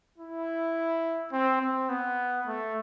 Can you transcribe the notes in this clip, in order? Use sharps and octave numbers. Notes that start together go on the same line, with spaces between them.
E4
C4
C4
B3
A3